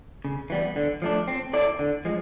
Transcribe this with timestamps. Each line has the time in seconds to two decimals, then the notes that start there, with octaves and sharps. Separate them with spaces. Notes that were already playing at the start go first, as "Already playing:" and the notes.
0.25 C#3
0.50 E3 G3 B3
0.76 D3
1.02 F3 A3 D4
1.28 C4
1.53 E4 A4 D5
1.79 D3
2.05 F3 G#3